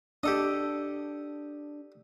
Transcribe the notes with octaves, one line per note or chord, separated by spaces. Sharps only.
D4 G4 A4 D#5